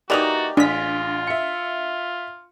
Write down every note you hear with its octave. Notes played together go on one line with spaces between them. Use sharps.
E3 A#3 D#4 F#4 G4 D5 F7
A1 G#3 D4 F4 B6
E5 C#7